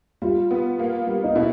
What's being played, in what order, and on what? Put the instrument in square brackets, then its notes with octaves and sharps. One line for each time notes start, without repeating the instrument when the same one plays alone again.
[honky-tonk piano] G3 [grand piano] F4
[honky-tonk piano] B3
A#3
G3
[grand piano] D#4
[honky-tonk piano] B2 [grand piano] E4